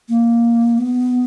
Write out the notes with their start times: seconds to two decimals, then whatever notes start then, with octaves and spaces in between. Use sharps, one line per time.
0.09 A#3
0.78 B3